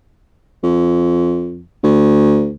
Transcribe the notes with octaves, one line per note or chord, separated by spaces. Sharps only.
F2
D2